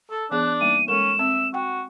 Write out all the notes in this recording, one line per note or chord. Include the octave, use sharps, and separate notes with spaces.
A4
E3 B3 D4 G#4 F#6
G3 A#3 D#4 D#7
G#3 C#4 A4 A#4 E7
C4 E5
F#4 F#5 G5